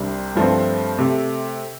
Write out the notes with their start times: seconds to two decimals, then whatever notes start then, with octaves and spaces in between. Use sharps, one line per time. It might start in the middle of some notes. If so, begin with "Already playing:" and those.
Already playing: C2 C3 G3 D4
0.35 G2 F3 A3 C4
0.98 C3 A3